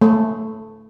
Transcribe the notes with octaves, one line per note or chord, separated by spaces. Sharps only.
A3